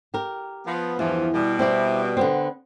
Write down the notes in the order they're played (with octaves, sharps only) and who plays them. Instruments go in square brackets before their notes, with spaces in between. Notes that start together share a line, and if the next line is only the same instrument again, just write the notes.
[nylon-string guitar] G4 A#4
[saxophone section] F3 B3
[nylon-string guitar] E2 [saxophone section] G2 E3 F3
[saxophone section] B2 G3
[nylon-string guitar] C4 E4 D5
D3 B3 C4